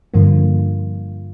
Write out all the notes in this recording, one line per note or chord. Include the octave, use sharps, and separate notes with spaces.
G2 D3 F3 A#3 F4